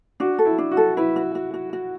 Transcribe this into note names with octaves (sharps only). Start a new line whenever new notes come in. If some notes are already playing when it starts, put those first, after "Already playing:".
D4 F#4
A4
E4
D4
F#4
A4
E4 B4
F#4
F#4
F#4
F#4